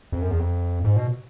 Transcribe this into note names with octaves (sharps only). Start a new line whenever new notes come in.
F2
F#2
E2
F2
G#2
B2